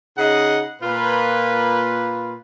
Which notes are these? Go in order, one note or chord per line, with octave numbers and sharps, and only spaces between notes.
C#3 D#4 G#4 D#5 F#5
A#2 A#3 F4 B4